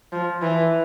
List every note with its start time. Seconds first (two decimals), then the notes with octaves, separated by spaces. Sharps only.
0.12 F3
0.42 E3